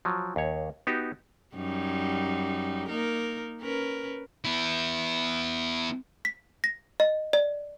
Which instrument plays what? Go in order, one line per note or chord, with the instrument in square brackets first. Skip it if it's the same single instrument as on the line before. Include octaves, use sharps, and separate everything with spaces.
[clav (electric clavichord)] F3 F#3
D#2 C#5
B3 D#4 F#4 G4
[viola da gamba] F#2 G3 D#4
A#3 D#4 A#4
C#4 A#4 B4
[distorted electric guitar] B3 E4
[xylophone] B6
A#6
D#5
D5